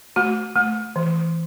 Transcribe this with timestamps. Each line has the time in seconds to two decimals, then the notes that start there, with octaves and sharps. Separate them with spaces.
0.16 A3 F#4
0.56 A3
0.96 E3